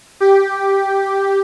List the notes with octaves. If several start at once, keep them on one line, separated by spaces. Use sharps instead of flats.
G4